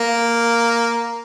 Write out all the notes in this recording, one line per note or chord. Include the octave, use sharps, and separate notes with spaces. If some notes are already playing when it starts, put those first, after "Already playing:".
Already playing: A#3